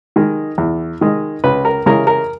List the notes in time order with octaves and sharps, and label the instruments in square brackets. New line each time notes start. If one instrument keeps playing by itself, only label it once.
[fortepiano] D#3 G#3
E2
D#3 G#3
C#2 B4
A#4
C#3 E3 G#3 A#4
A#4